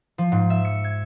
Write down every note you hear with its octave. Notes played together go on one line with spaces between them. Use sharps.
F3
G#2
E5
C#7
G#6